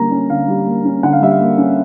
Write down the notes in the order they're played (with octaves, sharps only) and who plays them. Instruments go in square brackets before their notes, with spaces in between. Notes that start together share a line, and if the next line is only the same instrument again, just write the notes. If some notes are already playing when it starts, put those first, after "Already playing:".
Already playing: [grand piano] D3 G3 A#3 C#4 A#5
C#4
D3 F5
G3
A#3
C#4
D3 F#5
F5
G3 E5
F5
A#3
C#4